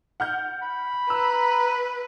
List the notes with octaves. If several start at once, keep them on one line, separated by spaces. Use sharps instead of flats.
F#5 F6 G6
B5
B4 A#5 E6